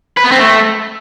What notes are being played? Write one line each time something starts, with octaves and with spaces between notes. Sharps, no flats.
B4
B3
C4
A3